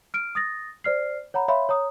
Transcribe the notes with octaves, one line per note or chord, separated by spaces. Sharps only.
F6 D7
D#6 A6 A#6
C5 D5 F6 C7
C#5 F#5 A#5 B5
C#5 E5 F5 B5 C6
C#5 A#5 D#6